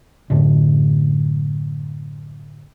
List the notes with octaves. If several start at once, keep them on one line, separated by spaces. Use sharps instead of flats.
F#2 A2 D3